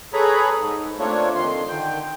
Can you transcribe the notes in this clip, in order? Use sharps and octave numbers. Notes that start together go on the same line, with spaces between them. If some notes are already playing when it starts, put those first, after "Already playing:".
G#4 A4 B4 C#5 A#5 B5
G#2
A3 A#3 C4 D4 F4 C#5
F2 D#3 C6
D3 D#3 G5